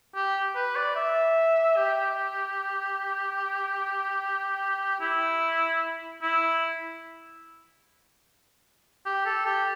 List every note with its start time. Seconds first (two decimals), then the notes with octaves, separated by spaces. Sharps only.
0.15 G4
0.55 B4
0.76 D5
0.96 E5
1.77 G4
5.00 E4
6.22 E4
9.06 G4
9.26 A4
9.46 G4